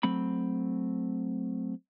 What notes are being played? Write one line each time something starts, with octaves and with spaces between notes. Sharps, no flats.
F#3 A3 C4 B5